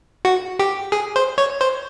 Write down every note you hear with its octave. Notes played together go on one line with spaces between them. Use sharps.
F#4
G4
G#4
C5
C#5
C5